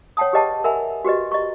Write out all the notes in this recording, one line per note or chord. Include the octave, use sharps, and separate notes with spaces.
C#5 F#5 G5 A5 D#6
G4 G#4 B4 D#5 G5 A5
A#4 E5 F#5 G#5 B5
F#4 G4 B4 D#5
D#5 A#5 C#6